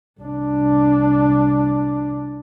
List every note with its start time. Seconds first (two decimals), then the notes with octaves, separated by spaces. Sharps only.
0.21 C2 D4